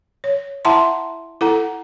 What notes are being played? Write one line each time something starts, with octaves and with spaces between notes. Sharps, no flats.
C#5
E4 E5 F#5 A5 A#5 C6
E4 A4 F#5 A#5